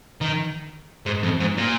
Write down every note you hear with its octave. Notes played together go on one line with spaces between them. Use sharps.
D#3
G#2
F2
G#2
A#2